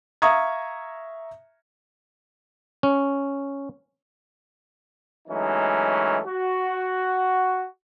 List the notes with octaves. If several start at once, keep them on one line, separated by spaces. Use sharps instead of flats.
E5 F5 A#5 C#6 D#6 G#6
C#4
E3 F#3 G#3 A3 C#4 D#4
F#4